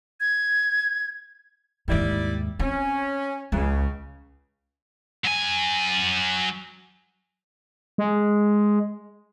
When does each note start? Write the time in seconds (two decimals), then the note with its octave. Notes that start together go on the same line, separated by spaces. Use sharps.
0.20 G#6
1.88 D#2 G#2 G3 E4 D5
2.59 C4 C#4
3.52 C#2 C#3
5.24 F#3 G#5
7.98 G#3